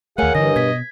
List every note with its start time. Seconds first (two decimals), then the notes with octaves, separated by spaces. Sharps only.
0.18 D#2 A3 G#4 A#4 C#5 F5 F#5 G#5
0.35 G2 D3 E3 D#5 A#6
0.56 B2 G#6 B6